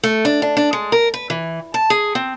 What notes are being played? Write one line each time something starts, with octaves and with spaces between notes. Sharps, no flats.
A3
D4
D4
D4
G#3
A#4
B4
E3
A5
G#4
C4